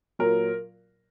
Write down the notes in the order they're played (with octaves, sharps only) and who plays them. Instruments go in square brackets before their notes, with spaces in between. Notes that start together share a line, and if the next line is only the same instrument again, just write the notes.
[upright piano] A#2 F#3 A#4